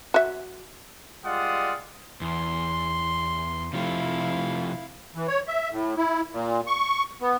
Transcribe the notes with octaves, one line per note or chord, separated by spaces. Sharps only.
F#4 E5
G3 G#3 F4 D5 F#5 D#6
E2 C6
C3 F3 A3 E4 F5
E3
C#5
E5
A2
E4
A#2
C#6
B3